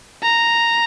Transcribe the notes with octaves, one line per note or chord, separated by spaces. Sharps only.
A#5